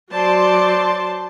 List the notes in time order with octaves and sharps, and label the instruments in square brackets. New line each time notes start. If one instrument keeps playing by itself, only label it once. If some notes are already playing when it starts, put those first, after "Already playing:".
[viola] F#3 D5 [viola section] C5 A5 C6